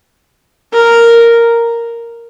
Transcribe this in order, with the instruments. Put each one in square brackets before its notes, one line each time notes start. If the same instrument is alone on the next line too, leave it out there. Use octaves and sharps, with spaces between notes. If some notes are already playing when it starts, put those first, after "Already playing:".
[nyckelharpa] A#4